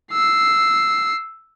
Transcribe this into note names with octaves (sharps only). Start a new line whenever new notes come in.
E6 C7